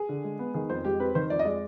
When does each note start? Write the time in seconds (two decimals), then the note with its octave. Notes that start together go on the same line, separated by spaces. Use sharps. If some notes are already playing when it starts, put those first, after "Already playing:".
Already playing: G#4
0.09 D3
0.24 G#3
0.39 B3
0.54 D#3 G#4
0.70 F2 C5
0.85 G#3 G4
1.00 C4 B4
1.15 D#3 C5
1.30 F2 D5
1.39 D#5
1.45 G#3 D5